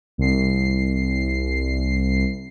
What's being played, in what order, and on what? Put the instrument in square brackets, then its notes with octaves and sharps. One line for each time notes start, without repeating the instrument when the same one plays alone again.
[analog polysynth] C2 C7